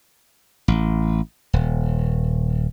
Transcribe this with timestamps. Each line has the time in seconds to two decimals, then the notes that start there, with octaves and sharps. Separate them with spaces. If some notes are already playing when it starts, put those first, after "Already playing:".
0.68 A1
1.53 D#1